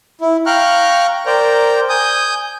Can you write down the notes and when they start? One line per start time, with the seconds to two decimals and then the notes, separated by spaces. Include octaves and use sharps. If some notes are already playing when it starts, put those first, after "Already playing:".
0.21 E4
0.46 F5 G5 A#5 C#6 F6 F#6
1.26 A#4 C5 D5 G5 A#5
1.89 G#5 D#6 G6